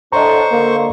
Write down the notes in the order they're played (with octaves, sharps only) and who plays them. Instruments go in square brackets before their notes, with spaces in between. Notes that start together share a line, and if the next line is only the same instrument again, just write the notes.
[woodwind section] A2 D3 D4 [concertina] C5 C#6 [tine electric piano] D#5 A#5
[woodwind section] D3 [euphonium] A#3